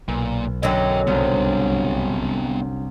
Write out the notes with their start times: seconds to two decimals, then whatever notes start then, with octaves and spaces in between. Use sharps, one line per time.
0.08 B1 A#2
0.63 F#2 D3 F#3 D#5 G5
1.07 C2 B3 D4